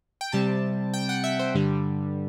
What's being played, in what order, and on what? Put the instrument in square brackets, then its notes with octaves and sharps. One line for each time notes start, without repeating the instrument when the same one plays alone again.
[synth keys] G5
C3 G3 C4 A5
G5
F#5
E5
C5
G2 D3 G3